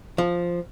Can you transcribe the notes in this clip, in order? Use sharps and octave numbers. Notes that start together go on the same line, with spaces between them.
F3